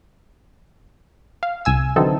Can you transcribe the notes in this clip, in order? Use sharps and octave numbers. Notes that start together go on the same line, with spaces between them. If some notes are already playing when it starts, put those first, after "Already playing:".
F5
C2 G#5 E6
D3 E3 F#3 C4 D#4 A4